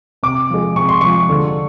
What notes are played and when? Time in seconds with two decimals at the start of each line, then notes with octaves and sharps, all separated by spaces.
0.23 C3 D6
0.50 F3 G#3
0.76 C3 C#6
0.89 C6
1.01 F3 G#3 C#6
1.30 D3